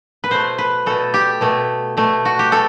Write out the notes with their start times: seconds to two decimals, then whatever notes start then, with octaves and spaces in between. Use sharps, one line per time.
0.24 B4
0.31 B2 A3 C5
0.58 B4
0.86 B2 A3 A4
1.14 G4
1.41 B2 A3
1.97 B2 A3
2.25 F#4
2.39 G4
2.52 B2 A3 A4